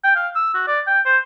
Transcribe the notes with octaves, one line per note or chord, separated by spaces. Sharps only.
G5
F5
E6
F#4
D5
G5
C5